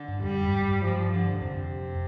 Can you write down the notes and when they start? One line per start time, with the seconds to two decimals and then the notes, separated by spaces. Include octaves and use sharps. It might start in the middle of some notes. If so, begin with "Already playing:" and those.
Already playing: D3
0.08 G2
0.23 F2 G3
0.43 G2
0.63 G2
0.83 F3
1.12 D3
1.41 F2 C3